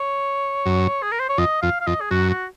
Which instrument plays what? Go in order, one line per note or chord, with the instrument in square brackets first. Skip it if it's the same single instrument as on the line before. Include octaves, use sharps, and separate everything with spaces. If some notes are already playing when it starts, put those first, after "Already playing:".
Already playing: [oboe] C#5
[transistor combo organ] F#2
[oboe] G#4
A#4
C5
C#5
[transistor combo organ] F2 [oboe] D#5
[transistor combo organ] F2 [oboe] F5
[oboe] F5
[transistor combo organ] F2 [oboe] D#5
[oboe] G#4
[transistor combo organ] F#2 [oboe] F#4
[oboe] F#4